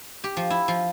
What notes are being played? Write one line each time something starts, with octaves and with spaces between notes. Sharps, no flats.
G4
F3
E4
F3